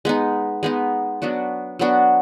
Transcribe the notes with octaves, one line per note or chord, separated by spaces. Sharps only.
G#3 B3 D#4
G#3 B3 D#4
F#3 B3 D4 F#4
F#3 B3 D4 F#4